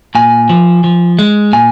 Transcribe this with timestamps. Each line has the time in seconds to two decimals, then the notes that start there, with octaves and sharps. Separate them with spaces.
0.15 A#2 G#5
0.49 F3
0.84 F3
1.19 G#3
1.53 A#2 G#5